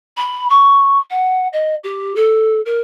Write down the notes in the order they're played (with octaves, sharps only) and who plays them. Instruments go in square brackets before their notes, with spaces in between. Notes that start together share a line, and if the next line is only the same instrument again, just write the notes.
[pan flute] B5
C#6
F#5
D#5
G4
A4
A#4